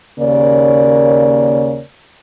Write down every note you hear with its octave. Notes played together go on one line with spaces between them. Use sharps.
D#2 C#3 A#3 A#4 C#5 D5